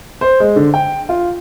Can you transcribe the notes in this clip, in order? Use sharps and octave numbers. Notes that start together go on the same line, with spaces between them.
C5
G#3
D3
G5
F4